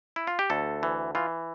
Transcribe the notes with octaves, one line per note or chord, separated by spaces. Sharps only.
E4
F4
G4
D2 A4
E3
E3 F4